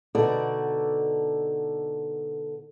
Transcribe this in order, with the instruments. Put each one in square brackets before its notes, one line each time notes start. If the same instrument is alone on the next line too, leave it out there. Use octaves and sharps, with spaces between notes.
[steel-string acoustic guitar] B2 D3 D#4 F#4 A4 D5